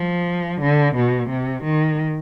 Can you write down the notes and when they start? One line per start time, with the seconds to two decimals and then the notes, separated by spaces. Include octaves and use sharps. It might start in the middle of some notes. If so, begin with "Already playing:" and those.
Already playing: F3
0.61 D3
0.96 B2
1.30 C3
1.64 D#3